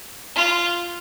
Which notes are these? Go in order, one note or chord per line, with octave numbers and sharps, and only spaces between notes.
F4